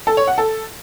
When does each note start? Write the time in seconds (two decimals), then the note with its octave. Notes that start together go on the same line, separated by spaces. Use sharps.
0.07 A4
0.17 C#5
0.27 F#5
0.38 A4